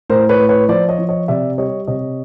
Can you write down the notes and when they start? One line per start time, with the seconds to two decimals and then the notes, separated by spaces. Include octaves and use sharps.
0.10 A2 A#4 C5
0.29 B4 C#5
0.40 A2
0.49 B4 C#5
0.68 F3 C5 D5
0.89 C#5 D#5
0.99 F3
1.09 C#5 D#5
1.28 C3 D5 E5
1.58 G3 C#5 D#5
1.87 C3 C#5 D#5